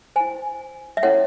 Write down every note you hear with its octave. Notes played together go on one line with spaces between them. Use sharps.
E4 C5 G#5
E5
C#4 E4 A4 C#5 F#5